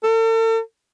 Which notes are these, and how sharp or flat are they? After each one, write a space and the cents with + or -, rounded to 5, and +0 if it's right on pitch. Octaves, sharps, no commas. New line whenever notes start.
A4 +40